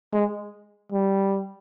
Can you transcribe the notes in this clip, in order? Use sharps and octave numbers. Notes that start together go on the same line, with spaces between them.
G#3
G3